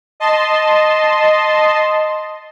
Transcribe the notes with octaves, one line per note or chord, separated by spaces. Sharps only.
D#5 A5 C6